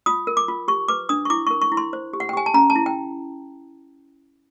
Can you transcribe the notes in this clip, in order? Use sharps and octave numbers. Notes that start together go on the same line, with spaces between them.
F4 D#6
A#4
D6
F4
G4 C#6
B4 D6
D4 D#6
C#6
E4 D6
A#4 C#6
C#6
E4
C6
C5
G4
F#5
G5
G4 G#5
A5
C#4 A#5
A5
E4
G5